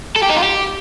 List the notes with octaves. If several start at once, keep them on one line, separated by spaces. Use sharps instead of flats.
A4
G4
D#4
F4
G4